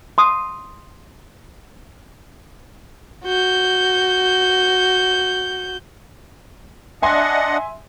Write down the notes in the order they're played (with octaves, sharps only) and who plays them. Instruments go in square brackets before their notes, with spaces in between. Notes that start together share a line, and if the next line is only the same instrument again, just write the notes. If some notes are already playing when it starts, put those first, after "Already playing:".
[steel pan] C6 D#6
[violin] F#4 G6
[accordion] D4 D#5 F#5 [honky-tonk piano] E5 G#5 C6